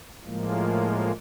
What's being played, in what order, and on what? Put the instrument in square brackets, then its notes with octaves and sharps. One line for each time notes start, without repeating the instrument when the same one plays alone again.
[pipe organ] A2 F3 G#3 A#3